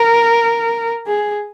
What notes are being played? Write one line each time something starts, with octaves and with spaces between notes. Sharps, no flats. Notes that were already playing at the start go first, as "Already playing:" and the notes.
Already playing: A#4
G#4